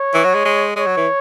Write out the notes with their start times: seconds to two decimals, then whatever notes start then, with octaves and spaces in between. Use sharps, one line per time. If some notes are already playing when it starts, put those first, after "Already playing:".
Already playing: C#5
0.14 E3
0.24 F#3
0.34 G#3
0.45 G#3
0.76 G#3 C#5
0.86 F#3
0.97 E3